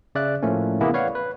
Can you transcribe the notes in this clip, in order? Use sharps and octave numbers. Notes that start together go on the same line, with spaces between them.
C#3 D5 E5 F#6
A2 F3 A3 A#3 C#4
C3 E3 A#3 B3 E4 G#4
B4 C#5 D5 F5 F#5
B4